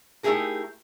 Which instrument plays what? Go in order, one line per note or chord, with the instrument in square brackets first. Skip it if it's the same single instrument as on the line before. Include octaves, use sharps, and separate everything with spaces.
[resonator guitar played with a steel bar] A3 D#4 E4 G4 G#4 A#4